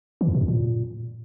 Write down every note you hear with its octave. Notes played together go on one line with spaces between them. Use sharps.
E3
F2
B2
F2
A#2